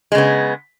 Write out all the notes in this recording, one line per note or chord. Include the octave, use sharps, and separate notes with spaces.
C#3 G#3 B3